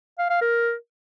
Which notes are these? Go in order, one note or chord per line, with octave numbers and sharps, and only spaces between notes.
F5
F5
A#4